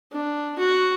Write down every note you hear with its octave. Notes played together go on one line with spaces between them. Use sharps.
D4
F#4